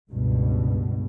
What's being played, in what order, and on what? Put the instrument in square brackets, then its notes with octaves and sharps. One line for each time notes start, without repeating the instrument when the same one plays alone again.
[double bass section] C#2 G2 B2